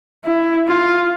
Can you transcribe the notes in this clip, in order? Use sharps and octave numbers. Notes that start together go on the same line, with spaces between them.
E4
F4